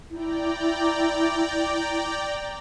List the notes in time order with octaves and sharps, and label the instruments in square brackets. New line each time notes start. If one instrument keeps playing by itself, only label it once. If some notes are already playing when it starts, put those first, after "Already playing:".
[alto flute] E4 [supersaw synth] D5 G5 A#5